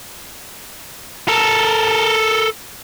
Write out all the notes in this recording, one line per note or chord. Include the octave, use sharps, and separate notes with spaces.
A4 A#4